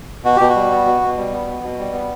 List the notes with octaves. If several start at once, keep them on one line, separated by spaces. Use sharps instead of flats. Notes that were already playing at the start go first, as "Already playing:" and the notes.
B2 F#4
B2 G4
F#4
G3
B3
B2
B2
G3
B3
B2
B2
G3
B3